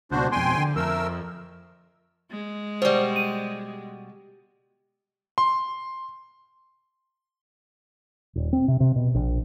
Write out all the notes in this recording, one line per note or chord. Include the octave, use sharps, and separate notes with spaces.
C#2 B2 D4 F#4 C5
F2 B2 G5 G#5 C6
D3
F2 A3 A#4 E6
G#3
B2 G3 C5 D5
D#7
C6
D#1
C4
C3
C3
B2
A#1